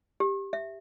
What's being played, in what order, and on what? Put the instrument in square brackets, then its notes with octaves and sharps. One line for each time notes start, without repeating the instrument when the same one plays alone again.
[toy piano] G4
E5